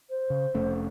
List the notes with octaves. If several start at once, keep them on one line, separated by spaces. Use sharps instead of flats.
C5
C#3
F1 A3 C#4